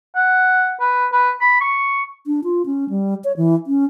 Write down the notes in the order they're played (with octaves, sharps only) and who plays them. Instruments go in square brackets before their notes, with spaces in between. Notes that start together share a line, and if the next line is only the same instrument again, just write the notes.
[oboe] F#5
B4
B4
B5
C#6
[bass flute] D4
F4
C#4
G3
C#5
E3
C#4